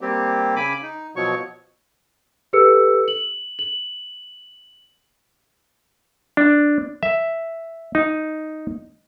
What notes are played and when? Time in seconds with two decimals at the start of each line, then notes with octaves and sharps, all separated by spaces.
0.01 G3 A#3 C4 G4
0.56 C#3 G#5 B5 D6
0.82 D#4
1.16 B2 F3 F#3 C#5 C#6
2.53 G4 A4 B4 E6 C#7
3.08 F#7
3.59 F#7
6.37 D4
7.03 E5
7.95 D#4